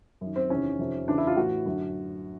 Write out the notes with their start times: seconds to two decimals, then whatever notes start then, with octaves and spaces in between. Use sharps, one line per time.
0.21 F#2 D#3
0.36 C4
0.50 E2 C3 D#3 C#4
0.79 F2 C3 D#3
1.08 E2 C#3 E3 D4
1.18 E4
1.27 F4
1.37 A2 E3 F#4
1.65 F#2 D3